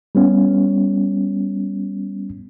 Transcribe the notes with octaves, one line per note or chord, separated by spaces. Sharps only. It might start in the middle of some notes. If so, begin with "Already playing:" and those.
G3 B3 C#4